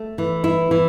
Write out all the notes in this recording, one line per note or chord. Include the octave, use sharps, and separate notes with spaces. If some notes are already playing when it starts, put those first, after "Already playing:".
Already playing: A3
E3
E4
E3